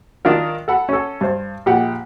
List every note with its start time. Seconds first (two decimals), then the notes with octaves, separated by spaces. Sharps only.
0.25 D#3 D4 F4 A#4
0.68 A4 F#5 B5
0.89 C#4 F#4 A4
1.21 G2 C5
1.66 A#1 G4 F#5